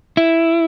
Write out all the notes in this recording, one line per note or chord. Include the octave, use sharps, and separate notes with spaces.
E4